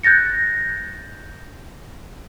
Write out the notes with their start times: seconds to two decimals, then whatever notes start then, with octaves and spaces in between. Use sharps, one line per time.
0.03 F#6 G6 A6 A#6 C#7